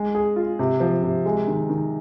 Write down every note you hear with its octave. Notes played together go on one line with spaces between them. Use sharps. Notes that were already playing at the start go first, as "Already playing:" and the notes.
Already playing: G#3
G#4
F4
C3
F3
C3
G#3
D#3
D#3